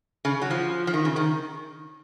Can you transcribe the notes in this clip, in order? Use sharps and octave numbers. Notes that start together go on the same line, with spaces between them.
C#3
F#3
F3
F3
D#3
C#3
D#3